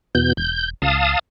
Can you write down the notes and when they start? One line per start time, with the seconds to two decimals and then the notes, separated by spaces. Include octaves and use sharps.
0.15 E2 B2 G6
0.37 E1 G6
0.82 C#2 F5 A5 D#6